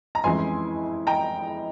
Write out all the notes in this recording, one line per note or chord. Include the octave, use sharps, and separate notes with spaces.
A#5
F2 E3 G#3 C#4 E4 G#5 C6
G5 A#5